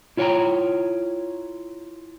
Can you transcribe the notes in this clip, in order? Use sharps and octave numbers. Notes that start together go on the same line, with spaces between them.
E4 F4 C#5 F#5 G5 A#5